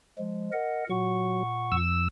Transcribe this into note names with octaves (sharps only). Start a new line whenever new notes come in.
F3 G#3
A#4 D#5 F#5
A#2 F#3 F#5 C#6
F2 E6